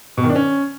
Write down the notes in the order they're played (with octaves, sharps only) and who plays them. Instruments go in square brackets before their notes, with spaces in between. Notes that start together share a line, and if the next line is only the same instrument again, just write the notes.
[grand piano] B2
D#3
D4
C#4